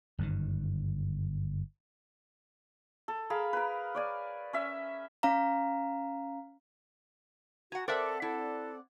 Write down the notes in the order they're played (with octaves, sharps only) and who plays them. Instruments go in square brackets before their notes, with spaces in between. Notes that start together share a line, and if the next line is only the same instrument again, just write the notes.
[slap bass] G1 F#2 C3 D#3
[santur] A4
G#4 A#4 F5 B5
A#4 B4
C#5 D5 G#5
C#4 E5
[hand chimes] C#4 F5 A#5
[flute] F#4 [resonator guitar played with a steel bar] F#5 A#5 [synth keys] G#5
[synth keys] C4 D5 F#5 [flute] A4 [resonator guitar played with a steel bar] A#4 E5
[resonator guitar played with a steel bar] E4 [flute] A4